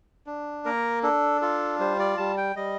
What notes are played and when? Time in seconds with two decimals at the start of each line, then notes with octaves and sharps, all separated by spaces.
0.27 D4
0.65 A#3 A#4
1.03 D4 A4
1.41 F4 A4
1.79 G3 C5
1.99 D5
2.18 G3 A5
2.37 G5
2.56 G3 D#5